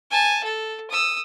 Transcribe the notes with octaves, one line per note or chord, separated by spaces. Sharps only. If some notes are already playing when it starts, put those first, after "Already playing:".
G#5 A5
A4
D#6 E6